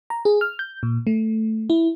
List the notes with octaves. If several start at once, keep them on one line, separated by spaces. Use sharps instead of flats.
A#5
G#4
F6
G6
A#2
A3
E4